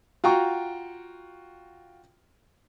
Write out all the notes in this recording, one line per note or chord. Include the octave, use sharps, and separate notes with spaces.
F4 F#4 G5 A#5 C#6